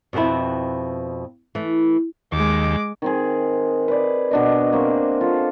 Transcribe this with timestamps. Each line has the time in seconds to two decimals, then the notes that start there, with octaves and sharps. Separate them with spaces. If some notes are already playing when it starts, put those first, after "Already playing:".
0.13 F2 B2 B3 C4 E4
1.55 E3 A3
2.32 D#2 G#3 D6
3.02 D#3 C4 G#4
3.88 B4 D5
4.31 B2 D4 D#5
4.72 A#3 C4 F#4
5.21 F4 A4